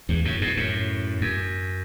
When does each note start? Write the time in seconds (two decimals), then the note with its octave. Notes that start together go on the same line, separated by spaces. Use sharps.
0.09 E2 G2
0.25 F#2 A2
0.41 G2 B2
0.57 F#2 A2
1.21 F#2